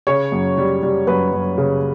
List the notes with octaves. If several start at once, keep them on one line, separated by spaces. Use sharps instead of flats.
C#3 C#5
F#2
G3
G3
F#2 B4
F#2
C#3